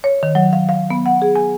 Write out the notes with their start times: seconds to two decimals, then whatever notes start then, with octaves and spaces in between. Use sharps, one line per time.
0.04 C#5
0.23 D#3
0.35 F#3
0.53 F5
0.69 F5
0.90 B3
1.06 F#5
1.22 G#4
1.36 G#5